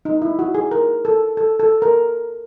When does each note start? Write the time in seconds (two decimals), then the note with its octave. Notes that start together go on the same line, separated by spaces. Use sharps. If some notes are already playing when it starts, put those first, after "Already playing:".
0.05 D#4
0.22 E4
0.39 F#4
0.54 G#4
0.71 A#4
1.05 A4
1.37 A4
1.60 A4
1.82 A#4